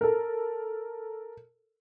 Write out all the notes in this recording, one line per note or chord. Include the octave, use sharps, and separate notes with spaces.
A4 A#4